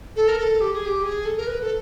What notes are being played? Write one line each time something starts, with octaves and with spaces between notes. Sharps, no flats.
A4
A#4
A4
G4
G#4
G4
G#4
A4
A#4
B4
A4